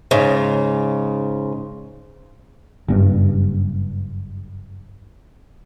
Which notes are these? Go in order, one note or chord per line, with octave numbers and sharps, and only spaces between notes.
G#2 C#3
F#1 G2